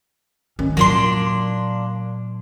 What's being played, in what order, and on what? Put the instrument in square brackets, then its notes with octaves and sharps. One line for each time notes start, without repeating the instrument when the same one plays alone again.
[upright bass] D#3 C#4
[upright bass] A#2 F#3 [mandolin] A#3 D4 C6